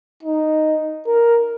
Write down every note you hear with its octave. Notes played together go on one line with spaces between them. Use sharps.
D#4
A#4